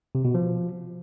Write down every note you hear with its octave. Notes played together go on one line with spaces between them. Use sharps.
C3
B2
F3